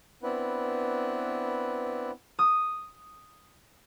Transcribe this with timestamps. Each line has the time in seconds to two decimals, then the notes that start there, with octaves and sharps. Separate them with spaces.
0.23 B3 C4 D4 E4 B4
2.39 D#6